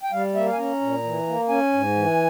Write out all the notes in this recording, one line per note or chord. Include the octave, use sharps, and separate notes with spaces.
G5
G3 F5
A#3 E5
F5
G#5
C#4 A#5
A#2
E3
A#3
C#4 G#5
G#2
E3